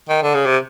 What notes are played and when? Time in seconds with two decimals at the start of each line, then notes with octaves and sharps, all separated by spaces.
0.09 D#3
0.23 D3
0.34 C#3
0.46 C3